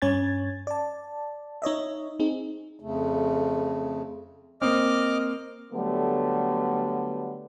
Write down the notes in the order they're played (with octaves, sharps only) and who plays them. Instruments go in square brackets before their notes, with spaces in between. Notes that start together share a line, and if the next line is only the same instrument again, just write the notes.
[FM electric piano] G2 C#4 C#5 G#5 G#6 A6
D5 A5
D#4 C#5 D#5 E5
C4 D#4 G#4
[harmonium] F2 C#3 A3
[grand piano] A#3 C4 [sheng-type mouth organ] D#5 D6 F6
[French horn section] D3 F#3 G3 A3 B3